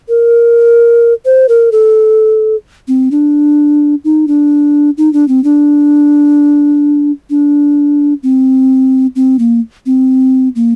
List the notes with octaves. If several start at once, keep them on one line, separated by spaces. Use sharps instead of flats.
A#4
C5
A#4
A4
C4
D4
D#4
D4
D#4
D4
C4
D4
D4
C4
C4
A#3
C4
A#3